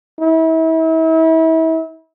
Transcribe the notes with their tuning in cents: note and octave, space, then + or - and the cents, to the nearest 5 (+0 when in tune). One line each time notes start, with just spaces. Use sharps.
E4 -35